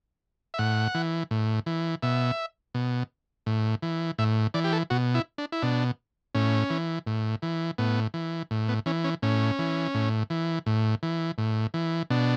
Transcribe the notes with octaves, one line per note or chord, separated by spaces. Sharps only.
E5
A2 F#5
E3
A2
E3
B2 E5
B2
A2
E3
A2 E5
E3 D5
G4
A4
B2 F#4
E4
D4
E4
B2 D4
A2 C#4
E3
A2
E3
A2 B3
E3
A2
B3
E3 C#4
C#4
A2 C#4
E3
A2
E3
A2
E3
A2
E3
B2 D4